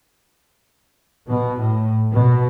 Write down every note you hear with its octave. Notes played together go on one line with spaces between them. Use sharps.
B2
A2
B2